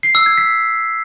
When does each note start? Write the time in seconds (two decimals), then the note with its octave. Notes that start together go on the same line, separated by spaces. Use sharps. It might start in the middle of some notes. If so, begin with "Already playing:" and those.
0.03 C7
0.15 E6
0.26 G#6
0.38 B6